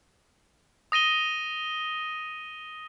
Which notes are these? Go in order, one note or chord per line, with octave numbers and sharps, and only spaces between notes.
D#6 A#6 D#7 G7